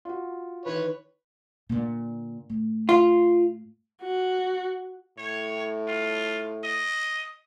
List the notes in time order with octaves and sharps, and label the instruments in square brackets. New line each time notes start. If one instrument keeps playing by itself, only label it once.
[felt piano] F4 F#4
[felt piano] D#3 E3 [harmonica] B4 C#5
[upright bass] A#2 D3
A2
[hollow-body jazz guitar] F4
[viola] F#4
[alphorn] A2 [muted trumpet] C#5
[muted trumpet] F4
D#5